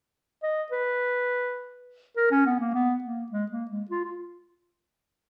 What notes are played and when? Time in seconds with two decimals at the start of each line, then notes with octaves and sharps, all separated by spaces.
0.43 D#5
0.72 B4
2.17 A#4
2.31 C#4
2.46 B3
2.60 A#3
2.74 B3
3.04 A#3
3.32 G#3
3.52 A#3
3.71 G#3
3.90 F4
4.04 F4